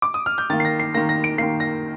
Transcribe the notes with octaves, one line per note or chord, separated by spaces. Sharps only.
D6
D#6
F6
G6
D#3 A#3 A6
C7
A#6
C7
D#3 A#3 A#6
A#6
D7
D#3 A#3 C7
A#6